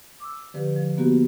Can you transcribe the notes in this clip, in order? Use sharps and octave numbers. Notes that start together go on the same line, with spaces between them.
D6 E6
D3 F3 G4 B4
F3
A#3 B3 F#4 G4